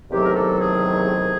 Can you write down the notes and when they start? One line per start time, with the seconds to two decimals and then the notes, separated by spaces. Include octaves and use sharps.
0.11 E2 C3 D#3 F#3 A3 G4
0.24 A#4
0.33 A4
0.57 G#4